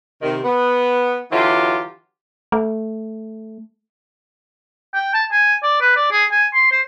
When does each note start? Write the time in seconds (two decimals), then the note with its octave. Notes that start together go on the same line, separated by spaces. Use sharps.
0.22 C3 D#3
0.44 B3
1.31 D3 E3 F#3 F4 G4
2.52 A3
4.95 G5
5.14 A5
5.32 G#5
5.63 D5
5.81 B4
5.96 D5
6.12 G#4
6.32 G#5
6.54 C6
6.72 C5